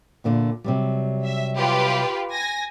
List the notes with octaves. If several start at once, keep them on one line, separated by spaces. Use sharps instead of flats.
E2 A#2 D3
C3 F#3 G3
E5
F4 G4 B4
G#5 A#6